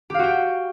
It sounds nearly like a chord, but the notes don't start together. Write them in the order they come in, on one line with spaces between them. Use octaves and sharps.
G4 F5 F#4 G5